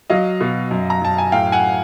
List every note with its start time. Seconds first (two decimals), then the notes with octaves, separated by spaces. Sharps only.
0.10 F#3 D#5 F5
0.41 B2
0.71 F#2
0.90 A#5
1.01 F#2 A5
1.18 G#5
1.32 A2 F5 G5
1.52 F#5 G#5